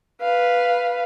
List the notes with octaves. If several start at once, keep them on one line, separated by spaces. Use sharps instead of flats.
B4 F5